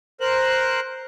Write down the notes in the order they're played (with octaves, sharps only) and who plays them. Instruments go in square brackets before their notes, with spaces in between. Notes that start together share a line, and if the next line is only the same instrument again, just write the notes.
[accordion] A#4 C5 F#6